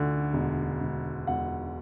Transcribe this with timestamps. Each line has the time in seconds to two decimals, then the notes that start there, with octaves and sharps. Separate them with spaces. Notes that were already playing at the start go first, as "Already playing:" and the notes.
Already playing: D2 D3
0.33 E1
0.80 E1
1.27 E1 F#5